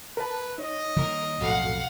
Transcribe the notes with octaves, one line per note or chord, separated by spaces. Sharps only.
A#4 B4 A5
D#4 C#5 D#5
D#3 G3 A#3 A#4
B1 F2 A2 F#4 A4 F5 F#5